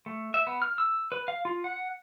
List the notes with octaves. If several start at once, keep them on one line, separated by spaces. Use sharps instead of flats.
A3
E5
B3
F6
E6
B4
F5
F4
F#5